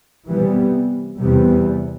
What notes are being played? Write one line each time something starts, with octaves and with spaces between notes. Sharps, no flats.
C3 E3 G3 B3
E2 C3 E3 G3 B3